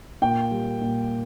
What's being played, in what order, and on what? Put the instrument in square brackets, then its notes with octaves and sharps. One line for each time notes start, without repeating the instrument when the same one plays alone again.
[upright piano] A#2 G5
G3
A#2